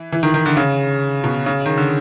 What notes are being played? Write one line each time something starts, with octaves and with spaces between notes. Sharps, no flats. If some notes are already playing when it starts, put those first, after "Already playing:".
Already playing: E3
E3
D#3
D#3
D3
C#3
B2
C#3
D#3
D3